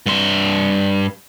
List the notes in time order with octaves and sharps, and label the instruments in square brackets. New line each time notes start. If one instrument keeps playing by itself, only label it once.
[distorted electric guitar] G2 C6